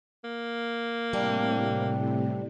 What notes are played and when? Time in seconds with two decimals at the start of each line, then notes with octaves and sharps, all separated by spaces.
0.24 A#3
1.13 A2 C3 G3 D4